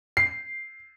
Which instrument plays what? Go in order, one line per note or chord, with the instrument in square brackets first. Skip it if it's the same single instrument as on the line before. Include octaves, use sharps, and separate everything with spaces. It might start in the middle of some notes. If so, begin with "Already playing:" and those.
[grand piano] C7